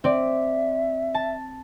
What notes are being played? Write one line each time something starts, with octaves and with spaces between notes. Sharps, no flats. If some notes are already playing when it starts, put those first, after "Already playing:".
C4 D5 E5
A5